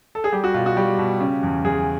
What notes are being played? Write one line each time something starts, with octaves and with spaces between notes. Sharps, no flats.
A4
G#4
G3 G4
F#4
B2 F4
F#4
G3 G4
B2
C#3
E2
E2 G#4